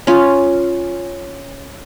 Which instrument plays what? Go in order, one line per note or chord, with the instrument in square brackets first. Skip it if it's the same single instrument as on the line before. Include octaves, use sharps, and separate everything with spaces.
[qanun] C#4 F4